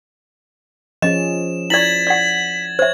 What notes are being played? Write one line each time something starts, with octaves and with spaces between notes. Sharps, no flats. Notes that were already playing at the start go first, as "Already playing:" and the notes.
F3 C#4 G#4 D#5 E7
E4 D5 G#6 A6 B6 F#7
D5 F#5
C5 C#5 E5 G#6